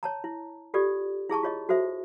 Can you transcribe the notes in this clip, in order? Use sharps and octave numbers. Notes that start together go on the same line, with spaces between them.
C#5 A5 A#5
E4
F4 G4 A4 D5
E4 G#4 A5 C#6
F4 C#5 D#5
F#4 A4 C5 E5